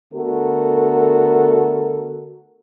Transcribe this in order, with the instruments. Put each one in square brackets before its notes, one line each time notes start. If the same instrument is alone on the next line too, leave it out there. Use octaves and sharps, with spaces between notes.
[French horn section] D3 A3 B3 F#4 A4 A#4